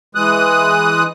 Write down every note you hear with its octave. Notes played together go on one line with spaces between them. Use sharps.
E3 G#3 D#6 F#6